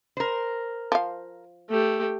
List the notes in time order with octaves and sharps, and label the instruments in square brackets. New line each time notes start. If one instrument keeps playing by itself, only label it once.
[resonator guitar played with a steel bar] A#4 C5
[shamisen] F3 F5
[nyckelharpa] A3 G4